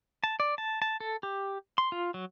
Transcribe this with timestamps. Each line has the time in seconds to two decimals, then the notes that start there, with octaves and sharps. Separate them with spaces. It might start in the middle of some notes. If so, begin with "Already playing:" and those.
0.24 A5
0.40 D5
0.58 A5
0.82 A5
1.00 A4
1.23 G4
1.78 C6
1.92 F4
2.14 F#3